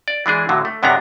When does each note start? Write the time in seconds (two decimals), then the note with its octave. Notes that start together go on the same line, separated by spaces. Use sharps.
0.08 D5
0.26 E3 G#3 D4 G#4
0.49 A2 D3 F#3
0.65 A3
0.83 F#2 C3 B3 C#4 D4 A#5